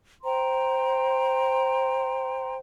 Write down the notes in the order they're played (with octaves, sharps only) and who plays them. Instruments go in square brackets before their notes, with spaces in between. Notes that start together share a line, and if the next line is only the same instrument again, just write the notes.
[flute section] C5 G5 A#5 C6